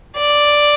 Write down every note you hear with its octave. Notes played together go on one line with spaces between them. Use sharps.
D5